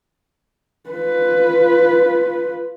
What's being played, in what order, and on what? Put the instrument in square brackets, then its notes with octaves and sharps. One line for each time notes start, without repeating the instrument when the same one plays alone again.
[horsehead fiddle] F4 B4